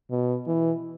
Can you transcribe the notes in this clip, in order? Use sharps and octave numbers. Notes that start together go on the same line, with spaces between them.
B2
E3